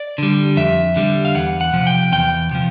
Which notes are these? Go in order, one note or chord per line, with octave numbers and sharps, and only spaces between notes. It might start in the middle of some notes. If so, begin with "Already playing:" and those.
Already playing: D5
D3 G3
F2 E5
D3 G3
F5
E2 F#5
F#5
C3 F3
G5
E2 G5
C3 F3